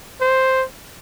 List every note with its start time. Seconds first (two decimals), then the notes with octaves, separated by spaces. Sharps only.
0.21 C5